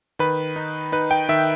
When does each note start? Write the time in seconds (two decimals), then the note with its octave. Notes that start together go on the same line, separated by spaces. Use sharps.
0.19 D#3 B4
0.56 D#4
0.92 D#4 B4
1.11 G5
1.29 D#3 E5